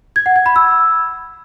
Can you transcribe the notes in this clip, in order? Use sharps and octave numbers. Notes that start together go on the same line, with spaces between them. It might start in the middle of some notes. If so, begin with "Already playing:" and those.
G#6
F#5
G#6
B5
E6